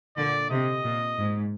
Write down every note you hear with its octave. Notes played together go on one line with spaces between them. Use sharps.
A#2 D3 D5
C3 D#5
A#2
G#2